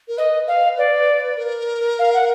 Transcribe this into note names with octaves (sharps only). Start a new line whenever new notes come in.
A#4
B4 D#5
F5
D5
A#4
F5
F#5